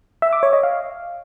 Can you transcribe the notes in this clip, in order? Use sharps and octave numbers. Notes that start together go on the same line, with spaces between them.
E5
D6
C#5
D#5
F5